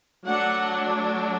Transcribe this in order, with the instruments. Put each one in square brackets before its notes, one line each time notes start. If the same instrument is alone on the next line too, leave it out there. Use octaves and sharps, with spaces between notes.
[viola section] F#3 A3 D4 F#5